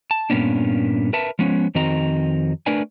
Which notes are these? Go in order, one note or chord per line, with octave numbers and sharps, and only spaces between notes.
A5
G2 A#2 A#3 B3 C#4 D4
A#4 B4 E5 A5
F3 G#3 B3 C#4
F2 D#3 C4 F#4 D#5 A#5
A3 D4 A#4 B4 D5 G#5